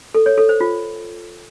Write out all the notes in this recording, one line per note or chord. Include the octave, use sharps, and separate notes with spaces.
A4
C#5
A4
C5
F4